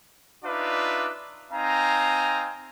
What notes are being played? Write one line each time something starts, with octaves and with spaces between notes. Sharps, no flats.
D4 D#4 F4 B4 D5 E5
C4 D#4 F5 G#5 A#5